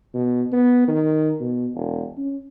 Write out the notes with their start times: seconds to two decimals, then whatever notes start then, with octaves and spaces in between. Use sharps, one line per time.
0.14 B2
0.52 B3
0.88 D#3
1.40 B2
1.75 E1
2.18 C#4